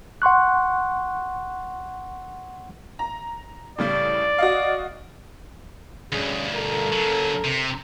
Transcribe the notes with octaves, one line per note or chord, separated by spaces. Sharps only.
F#5 C6 C#6 F#6
A#5
A2 C#3 G3 D5
F#4 D#5 F5
D2 G2 C#4 G#4
A4 A#4
C#3 F#3
C3